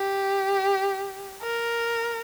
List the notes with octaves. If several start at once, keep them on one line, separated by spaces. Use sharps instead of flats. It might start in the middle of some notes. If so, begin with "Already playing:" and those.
Already playing: G4
A#4